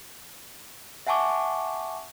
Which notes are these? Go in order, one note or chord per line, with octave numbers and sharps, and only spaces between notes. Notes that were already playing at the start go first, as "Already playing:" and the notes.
E5 F#5 G#5 A5 C#6 D6